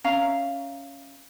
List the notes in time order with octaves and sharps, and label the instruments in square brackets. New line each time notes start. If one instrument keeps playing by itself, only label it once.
[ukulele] C#4 E5 F5 A#5